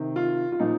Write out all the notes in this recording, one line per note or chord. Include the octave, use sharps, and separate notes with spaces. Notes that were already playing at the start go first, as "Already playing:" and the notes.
Already playing: C3 D#3
F4
F4
A#2 F3 D#4